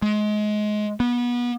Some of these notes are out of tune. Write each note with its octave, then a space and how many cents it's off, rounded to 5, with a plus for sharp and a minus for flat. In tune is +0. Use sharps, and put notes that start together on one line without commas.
G#3 +25
B3 -30